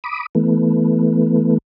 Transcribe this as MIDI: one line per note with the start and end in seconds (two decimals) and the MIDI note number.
0.04 0.26 83
0.04 0.26 86
0.04 0.26 87
0.35 1.58 52
0.35 1.58 57
0.35 1.58 59